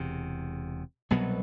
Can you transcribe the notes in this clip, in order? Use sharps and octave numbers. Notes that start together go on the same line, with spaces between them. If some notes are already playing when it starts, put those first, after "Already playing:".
Already playing: E1 E2 C3
C2 B2 F#3 B3